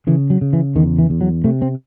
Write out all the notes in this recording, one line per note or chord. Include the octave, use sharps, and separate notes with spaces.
C#3 E3
F#3
C#3
E3
E2 D#3
E3
E2
F#3
C3 A3
C4